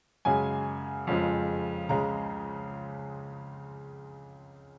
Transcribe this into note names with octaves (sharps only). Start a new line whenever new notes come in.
F#2 C#3 G#3 G#5
F2 C#3 F3 G#3
C#2 C#3 G#3 A#5